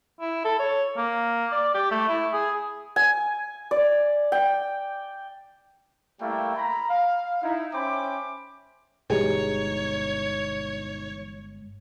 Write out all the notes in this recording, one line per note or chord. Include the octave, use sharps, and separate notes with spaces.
E4
A4
C#5
A#3
D5
G4
A3
E4
G#4
G#5
D5
G5
G3 A3 A#3 E4 F5 G5
A#5 B5
F5
D#4 E4
C#4 C5 E5 G5 B5 D6
G1 B2 E3 G#3 D#4 G4 G#4 C#5